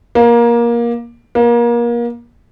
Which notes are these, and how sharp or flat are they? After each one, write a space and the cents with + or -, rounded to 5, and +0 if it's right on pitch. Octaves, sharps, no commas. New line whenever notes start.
A#3 +20
A#3 +30